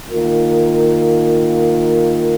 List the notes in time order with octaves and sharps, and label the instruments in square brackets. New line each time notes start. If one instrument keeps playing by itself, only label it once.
[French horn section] D#3 A#3 F4 A#4